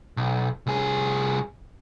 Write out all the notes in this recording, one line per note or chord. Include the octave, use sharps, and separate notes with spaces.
B1
C2 G#4